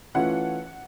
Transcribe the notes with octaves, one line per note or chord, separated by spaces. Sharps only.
E3 A3 C#4 F4 F#5